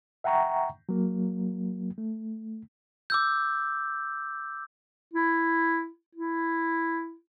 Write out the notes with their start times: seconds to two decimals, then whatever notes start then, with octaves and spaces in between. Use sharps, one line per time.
0.24 E5 F#5 G5 A#5 C#6
0.89 F#3 A#3
1.98 A3
3.10 D6 E6 G6
5.13 E4
6.15 E4